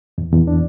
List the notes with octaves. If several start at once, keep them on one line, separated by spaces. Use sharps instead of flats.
E2
E2
D4